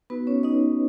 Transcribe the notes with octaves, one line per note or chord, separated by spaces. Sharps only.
B3 D#4 F#4 B4
C#4 C#5
D#4 D#5